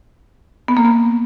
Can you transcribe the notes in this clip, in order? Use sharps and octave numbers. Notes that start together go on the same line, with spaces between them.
B3
A#3
B3